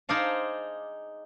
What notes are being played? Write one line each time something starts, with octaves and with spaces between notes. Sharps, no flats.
D#4 G#4 C5 D5 F5 A5